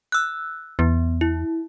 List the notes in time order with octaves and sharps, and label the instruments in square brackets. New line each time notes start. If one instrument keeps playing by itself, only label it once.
[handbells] E6 F#6
[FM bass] E2 [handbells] B3
[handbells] E4